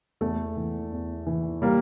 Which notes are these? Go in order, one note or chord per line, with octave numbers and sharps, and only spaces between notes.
E2 A3
E3
E2
E3
G3 A#3